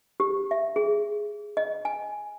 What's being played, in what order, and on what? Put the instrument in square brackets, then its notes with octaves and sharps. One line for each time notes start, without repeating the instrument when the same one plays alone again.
[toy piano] G4
E5
G#4
D#5
G#5